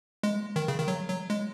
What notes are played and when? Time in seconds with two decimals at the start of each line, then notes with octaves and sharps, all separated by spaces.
0.23 G#3
0.56 D#3
0.68 C#3
0.78 D#3
0.88 F#3
1.08 F#3
1.30 G#3